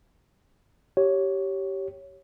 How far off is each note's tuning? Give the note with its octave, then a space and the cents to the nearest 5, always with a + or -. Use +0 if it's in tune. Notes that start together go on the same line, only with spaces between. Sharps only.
G4 -15 C#5 +0